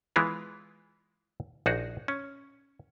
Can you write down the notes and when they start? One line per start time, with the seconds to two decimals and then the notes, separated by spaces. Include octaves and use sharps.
0.16 E3 G#3 B3 E4 F4
1.66 A#1 D#4 F#4 G#4
2.08 C#4